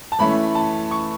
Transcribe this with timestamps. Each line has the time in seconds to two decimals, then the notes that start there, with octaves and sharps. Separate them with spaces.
0.12 A5
0.19 E3 A3 C#4 B5
0.55 A5
0.91 C#6